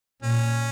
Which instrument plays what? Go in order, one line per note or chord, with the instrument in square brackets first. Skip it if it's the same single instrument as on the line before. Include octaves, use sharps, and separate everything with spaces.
[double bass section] A#2 [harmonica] C#4